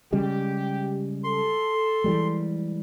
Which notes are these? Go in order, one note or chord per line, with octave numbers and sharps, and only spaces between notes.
C#3 G3 G#3 G4
A4 C6
E3 G3 G#3